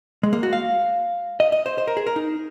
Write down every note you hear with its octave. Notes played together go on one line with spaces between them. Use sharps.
G#3
A#3
F#4
F5
D#5
D#5
C5
C5
A#4
G#4
A#4
D#4